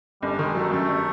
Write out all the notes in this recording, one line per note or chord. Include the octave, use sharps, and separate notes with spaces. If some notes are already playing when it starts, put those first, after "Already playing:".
G1 G3
D#3 G#3
F#3 A3
F#2 A3
G1